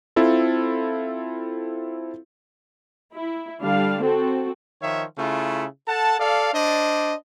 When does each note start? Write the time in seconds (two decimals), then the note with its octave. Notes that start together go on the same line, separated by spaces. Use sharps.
0.16 C4 E4 F4 A4
3.14 E4
3.62 D3 G3 D4 F5
4.02 C4 F#4 A4
4.83 D#3 F3 C#5 E5
5.19 C#3 A3 E4 F4
5.88 A4 F#5 A5
6.20 A4 D5 F5
6.54 D4 C5 D5 D#5